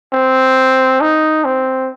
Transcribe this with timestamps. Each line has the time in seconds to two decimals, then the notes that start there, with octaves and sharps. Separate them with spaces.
0.13 C4
1.01 D#4
1.44 C4